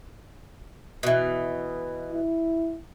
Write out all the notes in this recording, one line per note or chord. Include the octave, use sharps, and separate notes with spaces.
B2 E3
E4